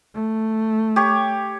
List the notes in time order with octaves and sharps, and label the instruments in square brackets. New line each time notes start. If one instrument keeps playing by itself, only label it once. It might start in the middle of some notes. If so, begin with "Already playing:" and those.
[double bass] A3
[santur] G4 C#5